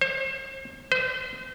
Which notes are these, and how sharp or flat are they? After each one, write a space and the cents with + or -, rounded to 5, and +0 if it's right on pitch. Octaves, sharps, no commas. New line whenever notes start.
C5 +40
C5 -35